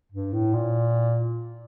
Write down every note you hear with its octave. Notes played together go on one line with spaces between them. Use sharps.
G2
A2
A#2